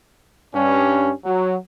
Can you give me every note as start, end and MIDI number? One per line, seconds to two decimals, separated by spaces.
0.53 1.10 43
0.53 1.10 61
1.24 1.55 54